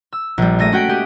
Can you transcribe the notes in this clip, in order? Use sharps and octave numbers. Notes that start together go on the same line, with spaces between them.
E6
A#1 G3
G#3 A3 A#6 D#7
C#4 F#4 G5 B6
G#3 G4 D#6